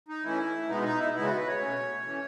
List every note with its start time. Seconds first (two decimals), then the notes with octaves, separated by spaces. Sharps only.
0.09 D#4
0.23 E3 A3 C#4 E4
0.68 B2 G#3 B3 D#4
0.83 D#4
0.98 E4
1.13 C#3 G#3 B3 E4
1.25 F#4
1.36 B4
1.48 C#5
1.58 B2 A3 C#4
2.04 E3 A3 C#4